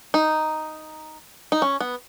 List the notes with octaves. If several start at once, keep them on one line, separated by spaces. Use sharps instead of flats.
D#4
D#4
C#4
B3